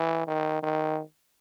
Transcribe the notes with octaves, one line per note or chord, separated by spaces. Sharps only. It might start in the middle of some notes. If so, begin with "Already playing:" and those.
Already playing: E3
D#3
D#3